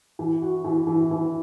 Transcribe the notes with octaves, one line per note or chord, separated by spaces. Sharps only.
E3
F#4
E3
E3
E3